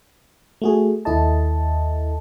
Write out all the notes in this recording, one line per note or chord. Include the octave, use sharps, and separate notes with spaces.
A3 F#4 G#4
D#2 E4 A4 D#5 A5